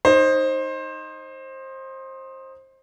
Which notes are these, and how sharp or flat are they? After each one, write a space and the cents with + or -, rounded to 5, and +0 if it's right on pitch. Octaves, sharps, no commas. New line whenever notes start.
D#4 +0 C5 +20